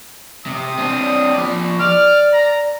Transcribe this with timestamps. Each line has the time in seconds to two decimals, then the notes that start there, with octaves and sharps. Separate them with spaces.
0.46 C3 D#6
0.79 C4 D4
1.34 F3 D5
1.80 D5 F6
2.34 A#5